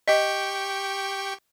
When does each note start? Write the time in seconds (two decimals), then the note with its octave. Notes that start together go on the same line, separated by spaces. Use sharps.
0.08 G4 D#5 G5 C#6